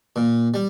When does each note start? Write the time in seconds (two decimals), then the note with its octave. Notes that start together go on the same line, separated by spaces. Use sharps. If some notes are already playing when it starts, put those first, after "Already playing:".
0.16 A#2
0.54 G3